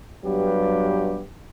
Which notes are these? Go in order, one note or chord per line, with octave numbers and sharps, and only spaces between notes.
G2 F#3 B3 G4